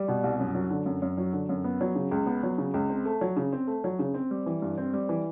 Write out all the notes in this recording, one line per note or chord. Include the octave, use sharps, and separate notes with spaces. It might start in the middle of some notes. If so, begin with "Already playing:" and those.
Already playing: G3
B2
C2
F#2
F#3
D3
F#2
F#2
F#3
D3
F#2
B3
F#3
C#3
C#2
B3
F#3
C#3
C#2
C4
A3
F#3
C#3
C4
A3
F#3
C#3
C4
G3
E3
G2
C4
G3
E3